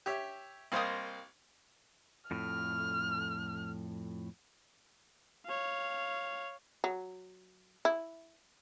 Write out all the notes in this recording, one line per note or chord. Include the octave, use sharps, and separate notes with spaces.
G4 C#5 E5
C2 A#3 C5 D#5 G5 D#6
F2 A2 F6
C#5 F5
F#3
E4